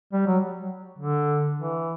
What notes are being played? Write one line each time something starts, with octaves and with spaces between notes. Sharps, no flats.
G3
F#3
D3
E3